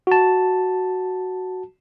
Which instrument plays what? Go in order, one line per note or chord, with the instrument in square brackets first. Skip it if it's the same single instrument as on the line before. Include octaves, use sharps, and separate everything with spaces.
[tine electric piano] F#4 A5